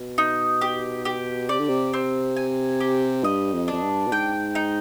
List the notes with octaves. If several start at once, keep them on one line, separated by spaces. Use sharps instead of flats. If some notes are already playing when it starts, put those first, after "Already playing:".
Already playing: B2
D#4
G4
G4
C3 D5
D3
C3
C4
G#5
G4
G2 D#5
F2
F2 D4
G2
B2
G#2 G5
D#4